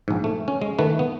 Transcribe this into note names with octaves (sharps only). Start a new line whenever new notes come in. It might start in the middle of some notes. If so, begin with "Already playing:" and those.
A#1 G#2
A3
C#4
G#3
D#3 A3 B4
B3